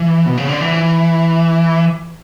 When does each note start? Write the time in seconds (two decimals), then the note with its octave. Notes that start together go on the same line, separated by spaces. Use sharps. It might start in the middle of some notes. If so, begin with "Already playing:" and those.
Already playing: E3
0.26 B2
0.37 C#3
0.49 D3
0.61 E3